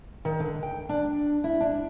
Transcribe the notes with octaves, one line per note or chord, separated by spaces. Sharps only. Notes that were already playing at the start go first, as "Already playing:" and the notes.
D#3
D3
G5
D4
E4
D4